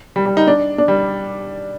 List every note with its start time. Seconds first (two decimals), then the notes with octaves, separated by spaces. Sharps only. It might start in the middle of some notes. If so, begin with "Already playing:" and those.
0.16 G3
0.26 G3
0.37 D#4
0.47 D4
0.78 D4
0.88 G3